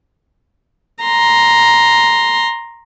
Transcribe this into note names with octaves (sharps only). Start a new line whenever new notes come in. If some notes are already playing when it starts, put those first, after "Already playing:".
A#5 C6